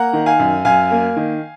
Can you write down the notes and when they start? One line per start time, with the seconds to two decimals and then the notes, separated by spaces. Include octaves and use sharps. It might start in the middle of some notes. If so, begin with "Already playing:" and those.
Already playing: A#3 F#5 A#5
0.13 D#3
0.26 F5 G#5
0.39 F#2
0.65 F#2 F5 G#5
0.91 A#3
1.16 D#3